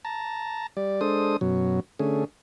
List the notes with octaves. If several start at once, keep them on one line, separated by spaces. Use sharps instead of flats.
A5 A#5
G3 D5
G#3 D4 A4 C5 D#6
F#2 B2 F#3
D3 A3 C#4 G#4